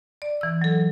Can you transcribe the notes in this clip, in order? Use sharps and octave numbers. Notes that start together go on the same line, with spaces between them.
D5
E3 E6
F#3 A4